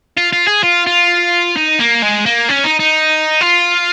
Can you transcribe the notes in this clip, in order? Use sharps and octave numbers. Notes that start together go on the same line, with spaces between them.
F4
F4
G#4
F4
F4
D#4
A#3
G#3
A#3
C#4
D#4
D#4
F4